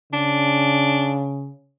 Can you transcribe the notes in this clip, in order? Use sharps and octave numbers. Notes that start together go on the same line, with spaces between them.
C#3 D4